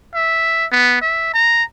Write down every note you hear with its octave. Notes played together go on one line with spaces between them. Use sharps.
E5
B3
E5
A#5